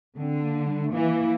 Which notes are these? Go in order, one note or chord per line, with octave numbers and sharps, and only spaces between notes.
D3 C4
A#3
G3
A3
E3 A#3